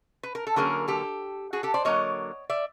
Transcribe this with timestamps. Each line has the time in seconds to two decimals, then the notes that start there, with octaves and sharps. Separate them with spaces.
0.23 B4
0.35 A#4
0.47 A4
0.56 D3 F#3 A#3 C#4 G#4 A#4
0.88 G4 A4
1.53 F#4 G#4
1.63 G4 A4
1.74 C5 D5
1.85 D3 F#3 A#3 C#5 D#5
2.50 D5 E5